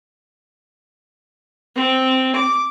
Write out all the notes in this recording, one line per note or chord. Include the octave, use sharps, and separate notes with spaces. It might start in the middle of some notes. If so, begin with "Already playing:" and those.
C4
D6